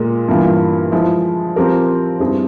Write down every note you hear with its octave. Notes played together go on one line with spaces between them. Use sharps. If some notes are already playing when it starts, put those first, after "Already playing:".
Already playing: A#2 G#3 A#4
G2 E3 A#3 F4
F3 G#3 E4 G#4
F3 C4 G4 A#4
G2 G3 C4 E4 G#4